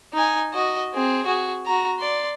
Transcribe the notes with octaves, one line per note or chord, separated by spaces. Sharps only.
D#4 G#5
F#4 D#5
C4 G#4
F#4 G#4
F#4 A#5
D5 C6